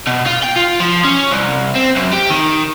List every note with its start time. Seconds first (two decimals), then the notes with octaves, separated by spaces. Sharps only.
0.07 B2
0.27 F4
0.44 G5
0.56 F4
0.80 F3
1.04 C#4
1.31 C2
1.75 C4
1.96 F#2
2.13 G4
2.30 D#3